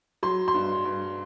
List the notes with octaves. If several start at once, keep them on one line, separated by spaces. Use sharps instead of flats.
F#3 C6
C6
G2
G2